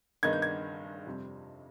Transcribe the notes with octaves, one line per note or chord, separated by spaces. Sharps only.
G2 D#3 B3 D#4 G#6
G6
G#6
F2 C3 G3 C4